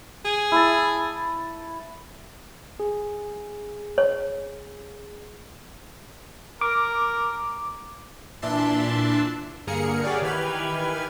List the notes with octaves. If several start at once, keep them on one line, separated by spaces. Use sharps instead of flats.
G#4
E4 A5
G#4
C#5
A#4 D6
A#2 E3 D4 E5 A5 C6
G2 D3 A#3 G#4 A#4 C#7
G4 G#4 C#5 D5 F5 F#5
D#3 E3 G4 B4 F6 G#6